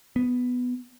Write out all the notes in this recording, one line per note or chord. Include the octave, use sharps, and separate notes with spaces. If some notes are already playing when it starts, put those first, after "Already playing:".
B3